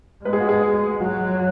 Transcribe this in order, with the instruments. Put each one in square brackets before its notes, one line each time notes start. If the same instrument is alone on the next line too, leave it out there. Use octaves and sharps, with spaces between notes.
[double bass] G#3 [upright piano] B4
[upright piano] G#4
F#4
G#4
[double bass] F#3 [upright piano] F#4